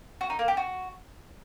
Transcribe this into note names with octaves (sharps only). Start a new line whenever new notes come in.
F#4
D#4
A#3
G4
F#4